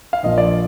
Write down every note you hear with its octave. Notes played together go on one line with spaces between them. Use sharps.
F5
A#1 A#2 F3 D#5
D5